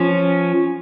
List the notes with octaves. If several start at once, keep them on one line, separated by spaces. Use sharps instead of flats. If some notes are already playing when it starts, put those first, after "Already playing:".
Already playing: F3 C#4